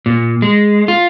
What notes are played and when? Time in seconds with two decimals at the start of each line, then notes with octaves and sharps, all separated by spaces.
0.06 A#2
0.42 G#3
0.88 F4